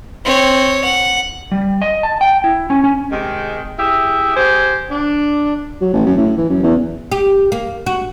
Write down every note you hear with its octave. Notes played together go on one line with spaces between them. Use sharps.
C4 C#5
F#5
G3
D#5
A5
G5
E4
C#4
C#4
C3 D#3 G#3
E4 G4 G#4 E5
G4 G#4 C5
D4
F#3
A1
F#2
A2
E3
F#2
E2
G4
A#3
F#4